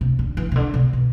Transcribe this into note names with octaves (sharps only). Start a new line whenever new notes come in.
C3
D3
E3
C3
D3
C3
B2